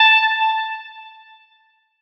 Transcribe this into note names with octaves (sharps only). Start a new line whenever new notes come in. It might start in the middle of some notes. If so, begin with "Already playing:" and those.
Already playing: A5